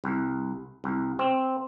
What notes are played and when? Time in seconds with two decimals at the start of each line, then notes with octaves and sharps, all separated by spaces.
0.04 C2
0.84 C2
1.19 C4